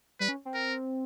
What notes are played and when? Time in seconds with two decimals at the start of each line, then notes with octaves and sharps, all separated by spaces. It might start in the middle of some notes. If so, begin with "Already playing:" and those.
0.20 G3 B4
0.28 C#4
0.45 C4
0.54 A#4